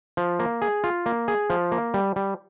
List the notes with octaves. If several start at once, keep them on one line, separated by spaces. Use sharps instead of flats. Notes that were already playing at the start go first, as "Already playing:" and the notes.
F3
A#3
G#4
F4
A#3
G#4
F3
A#3
G3
G3